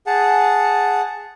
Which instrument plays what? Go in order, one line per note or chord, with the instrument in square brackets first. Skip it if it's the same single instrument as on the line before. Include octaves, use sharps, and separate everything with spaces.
[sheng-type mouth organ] G#4 F#5 A5